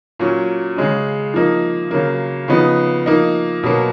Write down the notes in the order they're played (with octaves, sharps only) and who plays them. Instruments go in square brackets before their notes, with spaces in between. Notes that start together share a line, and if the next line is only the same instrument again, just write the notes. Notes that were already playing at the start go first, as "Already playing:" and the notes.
[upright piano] A#2 F#3 C#4
C#3 G#3 C#4
F3 A#3 D#4
C#3 F#3 A#3
C#3 F3 B3 D#4
F3 A#3 D#4
B2 F#3 A#3